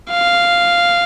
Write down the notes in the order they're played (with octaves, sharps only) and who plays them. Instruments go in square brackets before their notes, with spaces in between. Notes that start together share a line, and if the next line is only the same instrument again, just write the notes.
[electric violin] F5